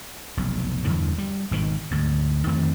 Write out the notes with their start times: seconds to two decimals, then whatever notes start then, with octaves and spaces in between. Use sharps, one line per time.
0.37 F1 B1
0.84 E2 G2 D3 E3
1.18 G3
1.51 G#1 B2 D#3
1.91 D2 G#2
2.47 F2 D#3 A3 C4